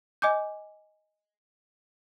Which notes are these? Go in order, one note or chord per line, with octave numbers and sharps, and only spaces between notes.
D#5 G#5 D6 G6